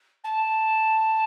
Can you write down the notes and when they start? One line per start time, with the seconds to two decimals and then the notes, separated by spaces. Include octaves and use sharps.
0.24 A5